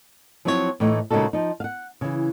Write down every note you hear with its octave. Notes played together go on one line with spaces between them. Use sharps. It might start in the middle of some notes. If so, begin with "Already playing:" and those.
F3 F#3 C4 E4 G#4 C#5
A2 E3 A3 D#4
A#2 C#3 G#3 D#4 F#4 A4
F3 D#4
F5 F#5
C#3 E3